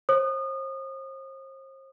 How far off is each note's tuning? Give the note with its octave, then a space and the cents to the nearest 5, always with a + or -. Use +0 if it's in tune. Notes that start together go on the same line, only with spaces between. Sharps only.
C5 +40 D#6 -30